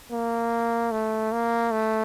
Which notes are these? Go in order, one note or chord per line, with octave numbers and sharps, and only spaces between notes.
A#3
A3
A#3
A3